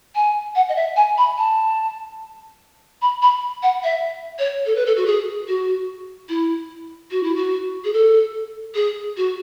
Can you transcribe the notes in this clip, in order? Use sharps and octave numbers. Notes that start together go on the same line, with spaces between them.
G#5
F#5
D#5
E5
G#5
B5
A5
B5
B5
F#5
E5
C#5
A4
B4
A4
F#4
G#4
F#4
E4
F#4
E4
F#4
G#4
A4
G#4
F#4